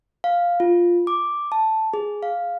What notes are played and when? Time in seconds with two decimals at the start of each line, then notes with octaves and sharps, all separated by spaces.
0.24 F5
0.60 F4
1.07 D6
1.52 A5
1.93 G#4
2.23 F5